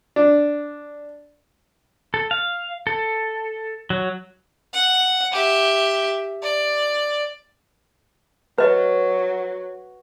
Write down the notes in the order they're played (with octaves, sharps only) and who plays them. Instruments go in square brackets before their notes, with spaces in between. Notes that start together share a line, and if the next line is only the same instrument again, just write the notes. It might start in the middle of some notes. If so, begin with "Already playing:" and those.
[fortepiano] D4
[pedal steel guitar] A4
F5
A4
F#3
[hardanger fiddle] F#5
G4 E5
D5
[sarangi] F#3 [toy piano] B4 D#5